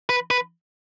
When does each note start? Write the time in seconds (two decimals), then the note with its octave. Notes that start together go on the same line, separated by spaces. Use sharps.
0.09 B4
0.31 B4